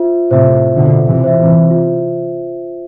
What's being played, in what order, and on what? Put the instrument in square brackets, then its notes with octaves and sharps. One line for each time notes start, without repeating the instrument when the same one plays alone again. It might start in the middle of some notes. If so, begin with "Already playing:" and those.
Already playing: [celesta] F4 C5 E5
[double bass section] A2 C3 [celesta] C5 E5
[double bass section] B2 D3 [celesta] F4
[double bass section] C3 E3
[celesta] C5 E5
[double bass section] C3 E3
[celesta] F4